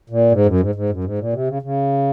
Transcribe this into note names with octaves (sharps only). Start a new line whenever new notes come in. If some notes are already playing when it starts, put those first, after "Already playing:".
A#2
G#2
F#2
G#2
G#2
F#2
G#2
A#2
C3
C#3
C#3